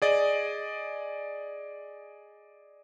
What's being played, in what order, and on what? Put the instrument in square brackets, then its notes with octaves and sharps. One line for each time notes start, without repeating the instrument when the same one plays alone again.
[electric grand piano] G#4 D5 D#5